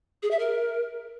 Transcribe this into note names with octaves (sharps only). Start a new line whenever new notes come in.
G#4
E5
A#4